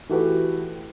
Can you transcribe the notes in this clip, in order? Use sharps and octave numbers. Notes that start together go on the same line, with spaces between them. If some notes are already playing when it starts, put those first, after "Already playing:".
E3 A3 F#4 G4 A4 B4